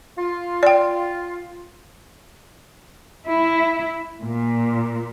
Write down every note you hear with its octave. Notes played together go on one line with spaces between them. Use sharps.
F4
D5 G5
E4
A#2